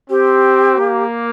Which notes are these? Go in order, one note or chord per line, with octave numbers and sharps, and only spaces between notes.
C4 G4
A#3